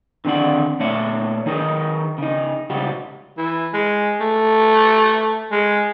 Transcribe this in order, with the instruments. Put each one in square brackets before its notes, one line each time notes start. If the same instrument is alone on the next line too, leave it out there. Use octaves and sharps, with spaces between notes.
[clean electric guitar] D3 D#3 C4 D5 F#5
A#2 A3 C#5 D5 E5
D#3 D#4 G#4 A#4 B4
C#3 D#4
C#2 C#3 G3 F#4 G4
[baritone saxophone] E3
G#3
A3
G#3